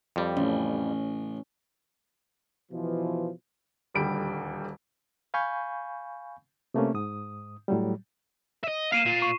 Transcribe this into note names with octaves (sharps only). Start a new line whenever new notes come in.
F2 G3
A1 C#4
B2 E3 F3
D#1 D2 G3 D7
F5 G#5 B5 C#6 G6
C3 A3 A#3 C#4
G#2 D#6
A2 F#3 G3
D#5 E5
A#3 F5 C7 D#7 E7
A#2 F4
C#6